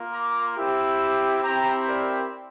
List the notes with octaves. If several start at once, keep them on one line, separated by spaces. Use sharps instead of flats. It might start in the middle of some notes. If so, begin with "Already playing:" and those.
Already playing: A#3 F4
A#5 D6
C4 E4 G4
C4 E4 G4 G5 A#5
A#4 D5